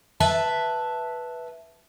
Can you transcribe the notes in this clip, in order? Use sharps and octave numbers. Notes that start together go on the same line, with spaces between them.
B4 E5 A5